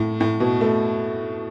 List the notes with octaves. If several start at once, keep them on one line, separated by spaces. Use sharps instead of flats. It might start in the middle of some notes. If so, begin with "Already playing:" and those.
Already playing: A2
A2
B2
A3